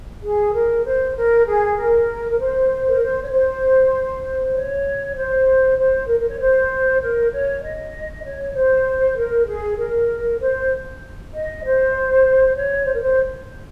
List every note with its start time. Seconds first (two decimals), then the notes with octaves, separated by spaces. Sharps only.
0.22 G#4
0.53 A#4
0.84 C5
1.15 A#4
1.45 G#4
1.76 A#4
2.30 A#4
2.38 C5
2.88 A#4
3.00 C5
3.22 C#5
3.30 C5
4.53 C#5
5.15 C5
5.77 C5
6.07 A#4
6.19 A#4
6.29 C#5
6.39 C5
7.01 A#4
7.31 C#5
7.62 D#5
8.23 C#5
8.54 C5
9.16 A#4
9.47 G#4
9.78 A#4
10.39 C5
11.32 D#5
11.64 C5
12.56 C#5
12.86 C5
12.94 A#4
13.02 C5